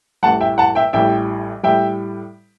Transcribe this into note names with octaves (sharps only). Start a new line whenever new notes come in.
A1 A2 G3 F#5 A5
E5 G5
F#5 A5
E5 G5
A1 A2 G3 E5 G5
A2 G3 E5 G5